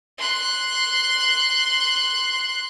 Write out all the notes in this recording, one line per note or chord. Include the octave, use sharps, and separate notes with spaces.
C6 F#6